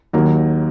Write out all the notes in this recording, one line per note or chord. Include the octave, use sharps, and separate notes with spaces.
D#2 D#3 F#3 A#3